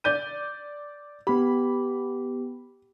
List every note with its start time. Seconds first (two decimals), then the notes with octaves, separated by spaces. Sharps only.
0.04 D5 G6 D#7
1.27 B3 G4 B5